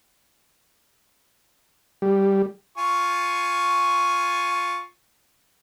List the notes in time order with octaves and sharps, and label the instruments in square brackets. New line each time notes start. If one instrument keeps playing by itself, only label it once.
[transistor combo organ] G3
[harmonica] F4 G#5 C#6